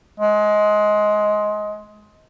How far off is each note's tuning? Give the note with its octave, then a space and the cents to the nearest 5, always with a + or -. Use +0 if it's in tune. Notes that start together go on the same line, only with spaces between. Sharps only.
G#3 +20